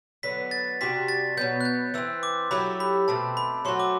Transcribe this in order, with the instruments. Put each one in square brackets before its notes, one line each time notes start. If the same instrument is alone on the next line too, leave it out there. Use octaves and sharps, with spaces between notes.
[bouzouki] D3 F#3 B3 [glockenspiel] B6
[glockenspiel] A6
[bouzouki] C3 G3 D4 F#4 [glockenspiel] B6
[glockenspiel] A6
[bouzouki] B2 F#3 B3 [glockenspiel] G6
[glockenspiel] F#6
G6
[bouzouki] E3 A3 C4 [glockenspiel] E6
[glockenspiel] D6
[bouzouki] F#3 A3 E4 G4 [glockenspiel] B5
[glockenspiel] B5
[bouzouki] B2 A3 C4 [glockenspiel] A5
[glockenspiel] B5
[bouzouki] F#3 A3 C4 F#4 [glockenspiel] C6
[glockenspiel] D6